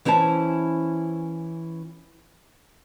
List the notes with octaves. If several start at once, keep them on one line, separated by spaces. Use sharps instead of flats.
E3 C#4 E4 C5 A5